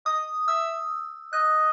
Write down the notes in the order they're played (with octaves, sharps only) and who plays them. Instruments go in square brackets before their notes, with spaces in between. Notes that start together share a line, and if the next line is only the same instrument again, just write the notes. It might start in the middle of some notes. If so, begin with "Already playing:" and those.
[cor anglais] D#5 [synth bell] D#6
[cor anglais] E5 [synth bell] E6
[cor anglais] D#5 [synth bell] F#6